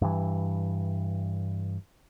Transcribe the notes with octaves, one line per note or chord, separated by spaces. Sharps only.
G2 E3